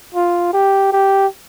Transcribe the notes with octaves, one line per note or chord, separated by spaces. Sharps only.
F4
G4
G4